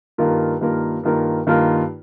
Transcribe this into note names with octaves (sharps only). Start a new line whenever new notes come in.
G2 D#3 A#3 F4 A#4
G2 D#3 A#3 F4 A#4
G2 D#3 A#3 F4 A#4
G2 D#3 A#3 F4 A#4